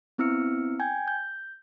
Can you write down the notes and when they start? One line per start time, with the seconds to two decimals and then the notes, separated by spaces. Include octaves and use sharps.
0.18 B3 C4 E4 E6 F6 C#7
0.79 G5 G#5 G6 G#6
1.08 G6